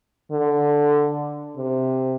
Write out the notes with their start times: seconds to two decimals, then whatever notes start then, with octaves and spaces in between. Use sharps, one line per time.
0.32 D3
1.57 C3